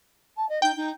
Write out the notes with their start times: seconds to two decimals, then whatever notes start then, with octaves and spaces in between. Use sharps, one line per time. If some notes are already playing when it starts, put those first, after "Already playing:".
0.36 A5
0.49 D#5
0.62 D#4 G5 G6
0.76 D#4